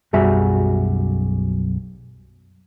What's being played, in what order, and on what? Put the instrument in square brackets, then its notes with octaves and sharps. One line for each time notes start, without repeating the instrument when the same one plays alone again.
[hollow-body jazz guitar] B1 F#2 G3 F#4 G#4 E5